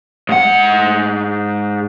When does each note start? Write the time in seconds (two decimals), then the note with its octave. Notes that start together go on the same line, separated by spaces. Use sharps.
0.29 G#2 F#5